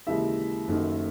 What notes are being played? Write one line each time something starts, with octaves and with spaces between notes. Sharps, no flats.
D#2 C#3 E3 G#3 E5
F#1 F#2 D#3 A3 D#4